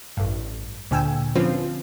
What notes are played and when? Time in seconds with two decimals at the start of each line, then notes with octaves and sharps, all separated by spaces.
0.17 A1 G2
0.91 D2 A#2 D3 G5 G#5 E6
1.35 D3 F3 C4 C#4 F4 B4